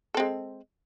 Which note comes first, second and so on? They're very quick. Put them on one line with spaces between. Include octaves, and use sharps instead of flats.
A4 C4 G#3